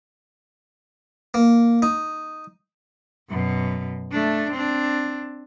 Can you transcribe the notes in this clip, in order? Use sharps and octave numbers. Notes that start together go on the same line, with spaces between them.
A#3
D#4
F#2 B2
A3 D4
C4 D4